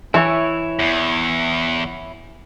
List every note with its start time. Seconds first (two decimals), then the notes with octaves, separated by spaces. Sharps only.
0.14 E3 E4 C#5
0.79 E2